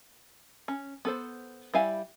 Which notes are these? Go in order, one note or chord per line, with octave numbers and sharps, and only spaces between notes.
C#4
B3 A4 C5
G3 E4 E5 F5 G#5